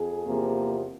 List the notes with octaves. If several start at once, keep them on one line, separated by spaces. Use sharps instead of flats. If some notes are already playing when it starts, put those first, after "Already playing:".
Already playing: F2 G#4
E2 C3 F3 A#3